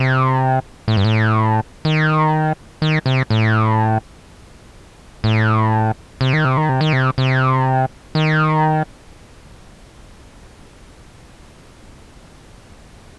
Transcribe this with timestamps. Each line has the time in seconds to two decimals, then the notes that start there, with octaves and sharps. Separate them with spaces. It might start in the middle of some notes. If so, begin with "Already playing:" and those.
Already playing: C3
0.88 A2
0.97 G2
1.05 A2
1.85 D#3
2.82 D#3
3.06 C3
3.30 A2
5.24 A2
6.21 C3
6.33 D#3
6.45 C3
6.57 D#3
6.69 C3
6.81 D#3
6.93 C3
7.18 C3
8.15 D#3